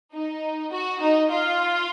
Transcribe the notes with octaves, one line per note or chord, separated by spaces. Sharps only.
D#4
F#4
D#4
F4